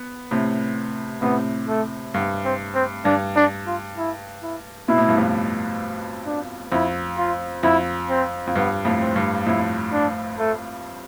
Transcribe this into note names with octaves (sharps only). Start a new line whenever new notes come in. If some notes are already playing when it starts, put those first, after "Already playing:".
Already playing: B3
A2 C3
A2 C3 B3
A3
G2 B3
C4
C4
G2 D4
D4
F4
E4
E4
B2 E4
A2
G2
F2 A2
D4
F2 E4
F4
F2 E4
C4
F2
G2 B3
F2 A2
C4
G2
F2 A2 E4
D4
A3